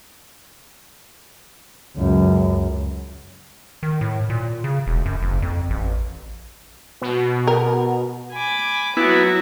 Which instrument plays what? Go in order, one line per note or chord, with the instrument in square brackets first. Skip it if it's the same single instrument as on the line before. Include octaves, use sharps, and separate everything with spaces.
[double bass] C#2 F#2
[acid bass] D#3
A2
A#2
C#3
E1
F#2
F#1
F2
A1
[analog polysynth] B2
[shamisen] A#4
[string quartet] G#5 B5 D6
[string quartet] F#3 F#4 [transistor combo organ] B3 E4